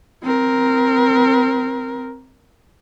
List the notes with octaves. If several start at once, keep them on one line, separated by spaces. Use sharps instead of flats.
C4 A#4